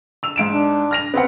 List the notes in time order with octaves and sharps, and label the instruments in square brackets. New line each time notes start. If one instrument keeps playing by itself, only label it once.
[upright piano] E6 F7
G#2 D7 E7
[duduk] D4
[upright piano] F6 A#6 F7
B3 C4 F#5